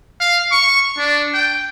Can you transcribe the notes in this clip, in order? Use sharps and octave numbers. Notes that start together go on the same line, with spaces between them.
F5
C#6
D4
G5